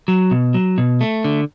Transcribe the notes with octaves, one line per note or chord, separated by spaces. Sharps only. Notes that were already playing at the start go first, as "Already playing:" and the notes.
F#3
B2
F#3
B2
A3
D3